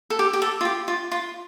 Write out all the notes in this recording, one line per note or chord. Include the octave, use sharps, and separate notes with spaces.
A4
G4
G4
A4
F4
G4
F4
F4